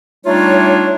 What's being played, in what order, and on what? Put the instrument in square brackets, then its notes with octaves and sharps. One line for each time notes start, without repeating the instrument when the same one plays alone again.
[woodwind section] G3 A3 D4 D#4 F4 C#5